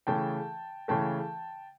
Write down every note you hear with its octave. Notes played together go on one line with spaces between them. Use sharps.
C#3 E3 A3 G5 A5
C#3 E3 A3 G5 A5